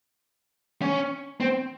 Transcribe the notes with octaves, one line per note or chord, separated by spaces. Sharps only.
C#4
C4